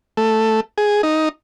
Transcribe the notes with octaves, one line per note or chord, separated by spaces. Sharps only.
A3
G#4
D#4